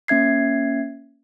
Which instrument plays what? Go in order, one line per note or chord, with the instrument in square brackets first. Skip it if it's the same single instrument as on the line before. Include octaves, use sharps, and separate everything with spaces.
[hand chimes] A#3 C#4 E5 G#6 C7